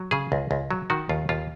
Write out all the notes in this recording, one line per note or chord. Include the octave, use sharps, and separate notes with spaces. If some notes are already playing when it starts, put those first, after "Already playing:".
Already playing: F#3
C#3 G#4
C#2
C#2
F#3
D#3 F#4
D#2 F4
D#2 F4